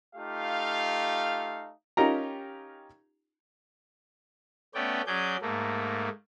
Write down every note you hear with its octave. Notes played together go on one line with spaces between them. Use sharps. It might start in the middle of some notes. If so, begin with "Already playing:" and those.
A3 D#4 F4 G4 F5
C#4 D#4 F4 G4 A#4 A#5
A3 B3 C#4 D5 G5
F#3 C#4 G#4 D5 G6
G#2 A3 A#3